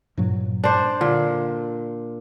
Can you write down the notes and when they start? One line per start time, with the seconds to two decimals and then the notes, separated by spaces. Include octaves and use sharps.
0.17 G2 A#2 F#3
0.64 D4 C5
1.01 A#2 D3